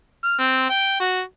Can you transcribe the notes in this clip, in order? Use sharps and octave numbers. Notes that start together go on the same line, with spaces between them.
F6
C4
G5
F#4